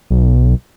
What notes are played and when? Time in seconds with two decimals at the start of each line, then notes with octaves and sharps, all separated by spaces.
0.10 B1